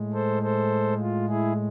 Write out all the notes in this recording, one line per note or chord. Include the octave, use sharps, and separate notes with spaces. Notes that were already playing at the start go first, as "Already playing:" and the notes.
Already playing: A2 G#3
A4 C5
A4 C5
F4
E4 G#4